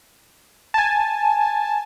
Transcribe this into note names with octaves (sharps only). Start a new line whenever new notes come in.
G#5 A5